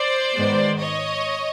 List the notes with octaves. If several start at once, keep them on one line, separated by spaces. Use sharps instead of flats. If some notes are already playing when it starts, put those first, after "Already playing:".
Already playing: C5 D5
G#2 D#3 G#3 B3
C#5 D#5